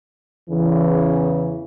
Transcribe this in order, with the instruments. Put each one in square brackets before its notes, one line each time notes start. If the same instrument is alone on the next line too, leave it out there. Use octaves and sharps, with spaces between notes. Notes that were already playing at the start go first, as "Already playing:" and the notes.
[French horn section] E2 C#3 E3